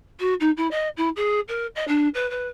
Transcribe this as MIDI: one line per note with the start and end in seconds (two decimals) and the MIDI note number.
0.20 0.34 66
0.40 0.50 63
0.57 0.68 64
0.71 0.88 75
0.97 1.09 64
1.16 1.40 68
1.48 1.67 70
1.75 1.85 75
1.88 2.08 62
2.14 2.29 71
2.30 2.48 71